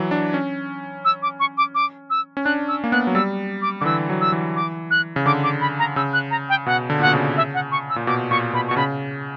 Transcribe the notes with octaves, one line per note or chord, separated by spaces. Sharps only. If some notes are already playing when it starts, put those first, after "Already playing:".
Already playing: E3 F#3
D4
C#4
E6
D6
C#6
D6
D6
E6
C#4
D4 F#6
E6
A#3
B3 F#6
F#3
G3 E6
D6
D3 D6
E3 E6
F#3
E6
E3
D6
F#6
C#3
D3 D6
D6
B5
A#5
C#3 E6
F#6
A#5
G5
B2 F#5
D3
A#2 F#5
B2
C#3
E5
F#5
C#6
E6
A#2
B2 D6
A#2 C#6
B2 B5
B2 C#6
C#3 B5